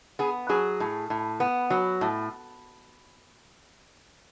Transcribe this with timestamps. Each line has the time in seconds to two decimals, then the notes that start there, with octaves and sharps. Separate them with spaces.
0.19 B3 G#4
0.49 F#3 G#4
0.80 A2
1.10 A2
1.40 B3
1.70 F#3
2.01 A2